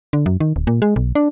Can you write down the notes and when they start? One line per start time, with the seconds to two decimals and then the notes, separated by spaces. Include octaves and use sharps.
0.13 D3
0.26 F#2
0.40 D#3
0.56 D1
0.67 A#2
0.82 G#3
0.96 B1
1.15 D4